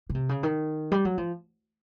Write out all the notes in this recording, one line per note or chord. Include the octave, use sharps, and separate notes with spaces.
C#3
C3
C#3
D#3
G3
F#3
F3